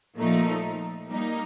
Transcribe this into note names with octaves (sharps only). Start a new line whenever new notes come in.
A#2 F3 A3 D#4
G3 A#3 D#4